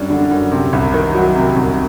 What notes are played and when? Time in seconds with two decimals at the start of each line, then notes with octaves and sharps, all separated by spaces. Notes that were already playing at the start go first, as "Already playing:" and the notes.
Already playing: F#2 G3 D4
0.10 D3
0.31 F#2
0.52 C3
0.73 C2
0.94 D#3
1.15 F#3
1.36 C3
1.57 C2